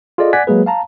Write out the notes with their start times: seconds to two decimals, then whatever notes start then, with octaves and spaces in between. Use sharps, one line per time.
0.18 F4 G#4 A4 D5 D#5
0.33 D5 F#5 G#5 F#6 G#6 B6
0.47 F#3 G#3 A#3 G#4 B4
0.66 F5 A5 A#5